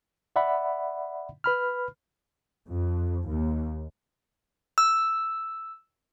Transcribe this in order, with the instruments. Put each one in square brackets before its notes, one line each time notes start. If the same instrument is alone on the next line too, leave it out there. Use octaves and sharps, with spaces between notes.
[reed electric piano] D5 E5 F#5 B5
B4 B5 F6
[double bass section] F2
D#2
[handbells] E6